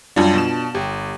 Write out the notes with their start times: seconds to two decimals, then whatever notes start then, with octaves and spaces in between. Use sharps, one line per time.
0.16 F#2 G3 D4 F4 A5
0.34 B2 E7
0.75 G1 G4